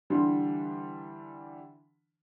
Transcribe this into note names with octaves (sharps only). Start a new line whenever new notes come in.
D3 E3 G3 D4 C6